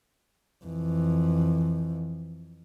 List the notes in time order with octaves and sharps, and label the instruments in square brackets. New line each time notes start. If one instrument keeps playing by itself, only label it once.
[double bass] F2 E3